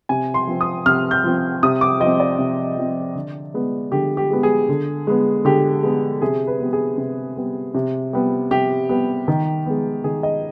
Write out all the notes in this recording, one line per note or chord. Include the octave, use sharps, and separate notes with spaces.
C3 G#5
C6
F3 C4
D#6
C3 F6
G6
F3 C4
C3 D#6
D6
F3 C4 D#5
D5
C3
F3 C4
D3
G#3 B3
D3 G4
G4
G#3 B3
G#4
D3
G#3 B3
D3 G4
G#3 B3
C3 G#4
B4
G3 B3
G#4
C3
G3 B3
C3
G3 B3
C3 G4
G3 B3
D#3
G#3 B3
D#3 G#4
D#5